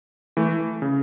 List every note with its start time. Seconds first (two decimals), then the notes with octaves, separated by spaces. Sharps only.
0.37 E3 A3
0.82 C#3